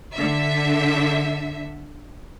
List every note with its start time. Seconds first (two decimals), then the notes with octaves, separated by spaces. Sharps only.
0.14 D3 E5